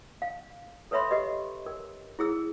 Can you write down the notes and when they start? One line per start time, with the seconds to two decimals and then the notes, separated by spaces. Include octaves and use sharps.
0.22 F5
0.91 A4 B4 C#5 E5 B5 C6
1.11 G4 B4 D#5
1.66 A#4
2.19 E4 G#4 E6